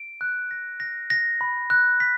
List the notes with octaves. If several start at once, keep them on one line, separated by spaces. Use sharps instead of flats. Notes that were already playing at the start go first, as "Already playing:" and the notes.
Already playing: D7
F#6
A#6
A#6
A#6
B5
F#6
B6